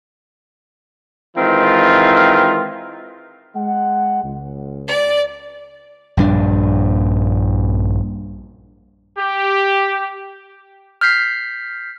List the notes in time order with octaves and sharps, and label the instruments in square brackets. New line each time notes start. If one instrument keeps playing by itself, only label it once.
[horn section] D#3 E3 G#3 C4 F4
[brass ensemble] G#3 F#5
C#2
[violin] D5
[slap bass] A#1 G2 D4
[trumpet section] G4
[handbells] F6 G6 B6 C7